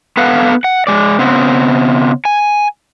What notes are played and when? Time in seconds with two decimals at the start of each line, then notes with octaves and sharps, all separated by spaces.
0.17 B3 A4 B4 F5 F#5
0.64 F#5
0.87 G#3 D5
1.19 C#3 B3 C4
2.25 G#5